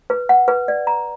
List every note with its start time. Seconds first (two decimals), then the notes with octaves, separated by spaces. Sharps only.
0.10 B4
0.29 F#5
0.48 B4
0.68 D5
0.87 A#5